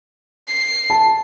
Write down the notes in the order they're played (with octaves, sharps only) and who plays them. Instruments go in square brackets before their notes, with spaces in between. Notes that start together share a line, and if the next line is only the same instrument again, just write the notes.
[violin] C7
[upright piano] A5